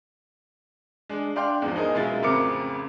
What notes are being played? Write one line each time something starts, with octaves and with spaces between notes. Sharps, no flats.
G#3 D4
D4 D5 F5 G5 C6
E2 G#2 F3
D#4 G#4 A#4 D#5
F#2 B2 G#3 E4 F4 A6
A1 F2 C#3 A#4 D6 C#7